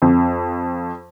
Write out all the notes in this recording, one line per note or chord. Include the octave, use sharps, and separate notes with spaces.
F2